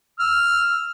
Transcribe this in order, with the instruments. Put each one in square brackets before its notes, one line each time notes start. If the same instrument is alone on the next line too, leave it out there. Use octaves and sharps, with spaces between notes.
[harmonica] E6 F6